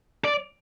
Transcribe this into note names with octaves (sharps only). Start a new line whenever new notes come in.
D5